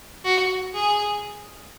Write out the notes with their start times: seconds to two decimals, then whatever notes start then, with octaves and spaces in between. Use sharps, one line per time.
0.25 F#4
0.74 G#4